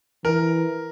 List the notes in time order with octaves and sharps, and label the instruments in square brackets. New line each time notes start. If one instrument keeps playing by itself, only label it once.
[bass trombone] E3 [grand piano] A#4